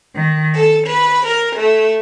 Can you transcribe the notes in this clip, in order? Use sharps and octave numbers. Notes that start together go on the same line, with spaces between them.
D#3
A4
B4
A#4
A3